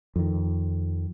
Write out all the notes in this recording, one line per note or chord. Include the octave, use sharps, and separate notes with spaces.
F2 D#3